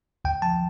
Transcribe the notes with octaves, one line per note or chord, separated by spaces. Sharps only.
D2 G5
F3 A5